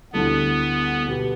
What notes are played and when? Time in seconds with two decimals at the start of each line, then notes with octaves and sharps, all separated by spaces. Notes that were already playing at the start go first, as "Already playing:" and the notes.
0.13 D2 D3 G3 B3 E4 A4
1.07 B2 B3 G4